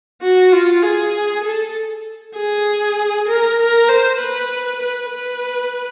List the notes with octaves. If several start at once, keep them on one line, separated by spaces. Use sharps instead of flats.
F#4
F4
G#4
A4
G#4
A#4
A#4
C5
B4
B4
B4